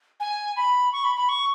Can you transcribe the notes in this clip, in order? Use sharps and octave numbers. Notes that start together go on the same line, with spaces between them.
G#5
B5
C#6
B5
B5
C#6